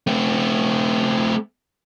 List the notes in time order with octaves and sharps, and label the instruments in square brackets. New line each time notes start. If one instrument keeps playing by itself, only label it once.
[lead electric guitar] A3 C4